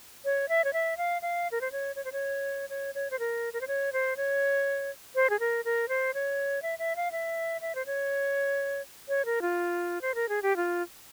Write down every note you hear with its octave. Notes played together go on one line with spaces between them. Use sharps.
C#5
E5
C#5
E5
F5
F5
A#4
C5
C#5
C#5
C5
C#5
C#5
C#5
C5
A#4
A#4
C5
C#5
C5
C#5
C5
G#4
A#4
A#4
C5
C#5
E5
E5
F5
E5
E5
C5
C#5
C#5
A#4
F4
C5
A#4
G#4
G4
F4